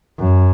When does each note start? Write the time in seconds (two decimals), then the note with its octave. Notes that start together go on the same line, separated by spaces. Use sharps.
0.19 F#2